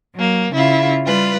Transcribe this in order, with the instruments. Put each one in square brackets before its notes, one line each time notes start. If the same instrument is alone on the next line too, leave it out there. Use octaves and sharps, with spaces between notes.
[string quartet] F#3 A#3
C#3 E4 F4
G3 F4 B4